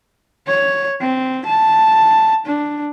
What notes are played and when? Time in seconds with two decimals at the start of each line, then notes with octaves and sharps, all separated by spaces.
0.47 C#5
1.01 C4
1.46 A5
2.46 D4